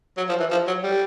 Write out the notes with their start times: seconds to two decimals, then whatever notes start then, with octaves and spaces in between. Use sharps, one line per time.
0.17 F#3
0.29 F3
0.40 E3
0.51 F3
0.67 F#3
0.83 G3